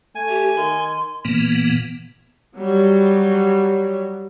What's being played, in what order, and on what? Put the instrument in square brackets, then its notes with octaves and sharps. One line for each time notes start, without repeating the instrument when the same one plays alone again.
[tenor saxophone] A3 [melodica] G#5
[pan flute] G4
[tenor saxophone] D#3 [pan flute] C6
[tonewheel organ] A#2 E3 A#3 B3
[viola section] F#3 G3